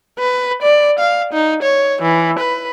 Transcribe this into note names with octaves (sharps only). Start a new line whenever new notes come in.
B4
D5
F5
D#4
C#5
E3
B4